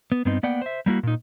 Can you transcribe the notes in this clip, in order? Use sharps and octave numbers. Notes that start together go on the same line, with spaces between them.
B3
G2 B3 C4 D#4
A#3 B3 D5 F#5 G5
C5 E5
G3 A#3 E4 F#4
A#2 D#4